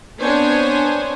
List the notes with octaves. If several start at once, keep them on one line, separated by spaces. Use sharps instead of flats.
B3 C4 D4 C5 C#5 G#5